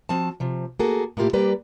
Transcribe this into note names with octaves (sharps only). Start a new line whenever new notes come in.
F3 C4 F#4 A5
C3 F3
A#3 F#4 G#4 A4
A2 A#3 E4 F4 G4
G3 A#3 G4 B4 D5